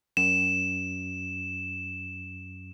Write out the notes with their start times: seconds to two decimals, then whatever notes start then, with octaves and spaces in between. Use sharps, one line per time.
0.17 F#2 E7